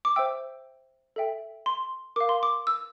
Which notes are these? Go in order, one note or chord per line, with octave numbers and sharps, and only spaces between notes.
D6
C5 E5 G5 E6
A4 E5 G5
C6
A#4 F5 D6
C6
D6
E6